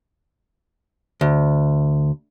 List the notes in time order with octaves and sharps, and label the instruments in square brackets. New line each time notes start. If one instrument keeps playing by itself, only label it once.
[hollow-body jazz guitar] D2